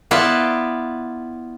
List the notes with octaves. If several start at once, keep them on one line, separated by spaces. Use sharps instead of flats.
B3 E4 F4 B4 D5 A5